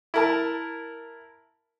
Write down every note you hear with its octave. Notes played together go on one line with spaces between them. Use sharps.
E4 A#4 A5